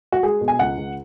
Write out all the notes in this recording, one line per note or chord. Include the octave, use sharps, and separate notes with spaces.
F#4
G#3 G#4
B2
G#5
C#2 F#5
C#2